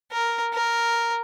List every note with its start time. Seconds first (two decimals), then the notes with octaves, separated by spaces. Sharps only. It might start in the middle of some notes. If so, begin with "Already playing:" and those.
0.12 A#4
0.54 A#4